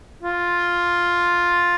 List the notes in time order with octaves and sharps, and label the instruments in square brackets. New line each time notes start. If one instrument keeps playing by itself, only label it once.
[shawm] F4